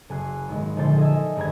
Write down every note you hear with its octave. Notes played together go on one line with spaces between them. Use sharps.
F#1 G#5 F#6 C7
G#1 G#3
A#1 D3 C5 A6
A4 D#5 E5 G#5
G#1 G2 B4 A#5 G#6